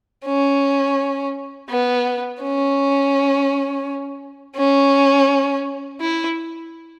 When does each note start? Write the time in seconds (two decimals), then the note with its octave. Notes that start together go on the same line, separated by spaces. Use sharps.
0.25 C#4
1.70 B3
2.42 C#4
4.56 C#4
6.01 E4